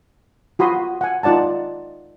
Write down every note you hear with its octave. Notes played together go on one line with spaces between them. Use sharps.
F4 F#4 B5 C6 D#6
F#5 G#5
D#4 F4 D5 F#5 A5